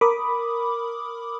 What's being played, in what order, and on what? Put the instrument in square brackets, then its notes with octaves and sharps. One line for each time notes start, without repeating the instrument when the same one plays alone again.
[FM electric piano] A#4 B5 D6 D#6